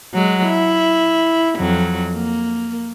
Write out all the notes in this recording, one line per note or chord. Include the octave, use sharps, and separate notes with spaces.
F#3 G#3
E4
F2 F#3
A#3